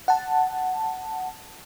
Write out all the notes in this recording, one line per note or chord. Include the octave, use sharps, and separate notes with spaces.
F#5 A5